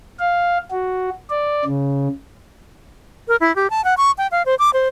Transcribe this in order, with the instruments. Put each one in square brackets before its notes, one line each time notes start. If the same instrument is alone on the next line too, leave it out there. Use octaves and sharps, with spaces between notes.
[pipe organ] F5
F#4
D5
C#3
[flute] A#4
E4
G4
A5
F#5
C#6
G5
F5
C5
D6
C5